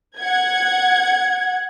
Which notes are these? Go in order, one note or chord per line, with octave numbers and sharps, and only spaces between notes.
F#5 G#6